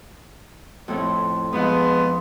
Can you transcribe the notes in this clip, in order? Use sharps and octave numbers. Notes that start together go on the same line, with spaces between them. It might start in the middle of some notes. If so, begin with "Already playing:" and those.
F2 A2 E4
F2 G#2 F3 G#3 B3